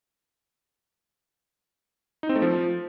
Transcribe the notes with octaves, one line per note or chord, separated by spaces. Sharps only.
D#4
C4
A3
F3